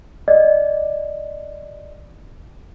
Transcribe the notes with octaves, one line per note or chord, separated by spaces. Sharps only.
D5 D#5